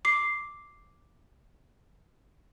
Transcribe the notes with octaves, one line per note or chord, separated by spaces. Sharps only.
D6 C7